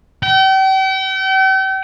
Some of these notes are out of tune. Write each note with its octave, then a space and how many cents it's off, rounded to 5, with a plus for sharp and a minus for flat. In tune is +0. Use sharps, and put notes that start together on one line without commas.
G5 -40